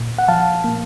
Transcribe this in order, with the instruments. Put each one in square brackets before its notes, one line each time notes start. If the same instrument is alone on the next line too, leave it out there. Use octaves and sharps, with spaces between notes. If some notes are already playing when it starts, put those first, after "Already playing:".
Already playing: [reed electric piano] A#2
F#5
F3 F5 A5
A#3